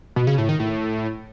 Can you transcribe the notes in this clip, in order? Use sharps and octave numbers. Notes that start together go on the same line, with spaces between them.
B2
C#3
A2
D#3
A2